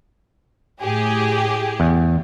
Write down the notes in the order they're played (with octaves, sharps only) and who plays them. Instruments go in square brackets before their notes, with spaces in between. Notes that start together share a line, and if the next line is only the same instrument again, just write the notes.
[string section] A2 G4 G#4
[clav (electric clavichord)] E2